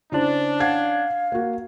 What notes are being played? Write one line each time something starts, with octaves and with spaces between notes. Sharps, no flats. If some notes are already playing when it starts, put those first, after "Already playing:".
C#3 C#4 D4 E4 C5
F5 F#5 G#6 C7
A#3 F#4